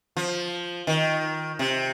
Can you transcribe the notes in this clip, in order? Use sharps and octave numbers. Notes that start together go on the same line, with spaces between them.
F3
D#3
C3